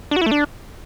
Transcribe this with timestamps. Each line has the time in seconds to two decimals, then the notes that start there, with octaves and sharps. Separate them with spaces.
0.11 D4
0.16 F#4
0.21 E4
0.26 A3
0.31 D4